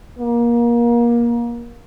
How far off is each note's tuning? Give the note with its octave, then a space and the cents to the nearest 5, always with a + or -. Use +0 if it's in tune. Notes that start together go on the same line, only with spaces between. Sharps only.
A#3 +25